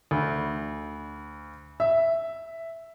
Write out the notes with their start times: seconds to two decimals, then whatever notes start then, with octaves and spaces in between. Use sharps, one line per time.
0.11 D2
1.80 E5